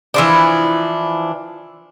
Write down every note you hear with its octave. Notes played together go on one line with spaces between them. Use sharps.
E3 F3 D4